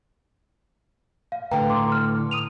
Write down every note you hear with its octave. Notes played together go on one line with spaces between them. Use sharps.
F5
A2 D3 B4 G5 A#5
C6 D6
F6
D#6 D#7 F7